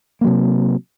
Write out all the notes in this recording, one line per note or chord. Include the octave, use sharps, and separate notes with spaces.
C3 F#3 A#3